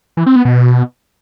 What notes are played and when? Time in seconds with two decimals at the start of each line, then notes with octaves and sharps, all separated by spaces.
0.17 E3
0.26 C4
0.36 B3
0.45 B2